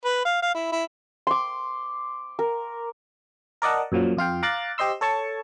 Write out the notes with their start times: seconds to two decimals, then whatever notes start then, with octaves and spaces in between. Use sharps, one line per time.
0.04 B4
0.25 F5
0.42 F5
0.55 E4
0.72 E4
1.27 C6 D6
2.39 A#4
3.62 A#4 D5 D#5 F#5 A5
3.92 F#2 A#2 F3 F#3
4.17 F2 F4 F5 G5
4.43 F5 A#5 D6 F#6 A6
4.78 G4 C5 D#5 C6 E6
5.01 A4 C#5 A5 C#6